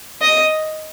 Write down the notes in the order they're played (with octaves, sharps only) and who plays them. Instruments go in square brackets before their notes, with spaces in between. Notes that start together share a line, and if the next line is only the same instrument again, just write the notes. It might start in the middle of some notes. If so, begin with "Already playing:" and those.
[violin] D#5